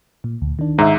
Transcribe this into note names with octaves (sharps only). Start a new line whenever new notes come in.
A#2
D2
D#3 D4
G#2 E5 A#5